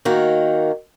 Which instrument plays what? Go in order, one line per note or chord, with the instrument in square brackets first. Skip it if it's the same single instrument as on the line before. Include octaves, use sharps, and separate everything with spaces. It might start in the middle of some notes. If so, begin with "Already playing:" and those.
[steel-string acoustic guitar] D#3 A#3 F#4